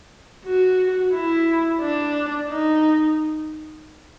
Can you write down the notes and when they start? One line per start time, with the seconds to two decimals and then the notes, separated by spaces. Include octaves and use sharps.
0.45 F#4
1.14 E4
1.81 D4
2.50 D#4